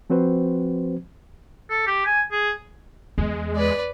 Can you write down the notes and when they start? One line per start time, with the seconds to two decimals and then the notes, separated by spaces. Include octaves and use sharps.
0.10 F3 C4 F#4 B4 C5
1.70 A4
1.86 G4
2.06 G#5
2.32 G#4
3.18 E2 G#3
3.55 B4 D5